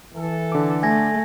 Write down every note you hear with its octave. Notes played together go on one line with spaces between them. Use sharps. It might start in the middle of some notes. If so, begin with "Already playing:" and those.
E3 A4
D3 D6
A3 G#5 G#6 A#6